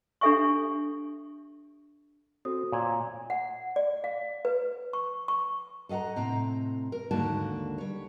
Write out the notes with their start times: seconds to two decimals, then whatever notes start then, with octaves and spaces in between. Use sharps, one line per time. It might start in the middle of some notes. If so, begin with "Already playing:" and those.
0.21 D4 G4 A4 E5 G#5 C#6
2.45 C4 F#4 A4 D#6
2.72 A#2 C#5 G#6
3.30 F#5
3.76 D5
4.04 F5
4.45 B4
4.93 C#6
5.28 C#6
5.89 A4 D#5 F5 F#5 A#5
6.16 A2 C3 C4 A#5
6.92 A#4
7.11 D#2 G#2 D3 A#3 F#4 A5
7.78 G3 C#5